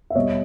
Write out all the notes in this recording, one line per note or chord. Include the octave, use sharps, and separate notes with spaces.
E5
B2 G3 C#5 D#5